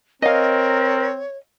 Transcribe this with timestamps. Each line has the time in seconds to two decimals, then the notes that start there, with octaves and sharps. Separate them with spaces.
0.22 C4 A#4 C#5 D#5 F5